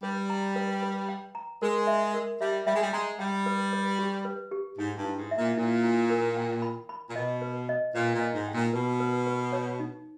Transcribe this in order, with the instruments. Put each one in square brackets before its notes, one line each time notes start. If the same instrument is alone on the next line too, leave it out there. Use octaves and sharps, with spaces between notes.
[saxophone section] G3 [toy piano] B4
[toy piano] A#5
B4
B4
G5
A#5
[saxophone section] G#3 [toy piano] A#4
[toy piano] E5
A#4
[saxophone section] G3 [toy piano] E5
[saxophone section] G3 [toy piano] E5
[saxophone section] G#3
G3
[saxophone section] G#3 [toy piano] A#5
[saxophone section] G3 [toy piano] G5
[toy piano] B4
B4
G4
B4
G4
[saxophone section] G#2 [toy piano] G#5
[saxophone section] G2
[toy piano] E4
[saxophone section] G#2
[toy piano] E5
[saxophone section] A#2
[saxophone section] A#2 [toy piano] E4
[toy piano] E4
A#4
G5
B5
B5
[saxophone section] A#2
[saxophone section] B2 [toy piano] D#5
[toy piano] B4
D#5
[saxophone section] A#2 [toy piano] B4
[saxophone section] A#2
[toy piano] D#5
[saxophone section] G#2
[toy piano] G5
[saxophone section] A#2
[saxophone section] B2 [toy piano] B4
[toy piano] B4
B4
C#5
D#4